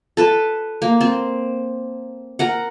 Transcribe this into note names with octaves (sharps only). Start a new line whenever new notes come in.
A4 B4 A5
A#3
C4
A#4 F#5